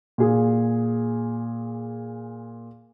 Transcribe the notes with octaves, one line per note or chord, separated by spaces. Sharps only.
A#2 G#4